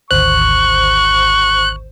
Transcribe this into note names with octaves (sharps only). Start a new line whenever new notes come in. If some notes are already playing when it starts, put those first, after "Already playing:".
G#1 D2 C5 C#6 F#6